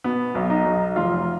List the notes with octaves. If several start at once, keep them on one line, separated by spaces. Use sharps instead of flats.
B2 B3
B1
D#4
B1
F1 F4